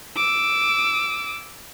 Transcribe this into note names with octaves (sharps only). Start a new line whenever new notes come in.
D6 E6